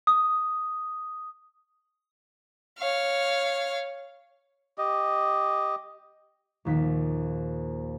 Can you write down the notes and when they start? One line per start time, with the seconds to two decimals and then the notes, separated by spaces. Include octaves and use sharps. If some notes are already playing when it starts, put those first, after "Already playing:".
0.07 D#6
2.79 C#5 F5
4.78 G4 D#5
6.65 A#1 D#2 B6